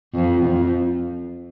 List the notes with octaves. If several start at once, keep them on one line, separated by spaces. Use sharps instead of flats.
F2
F2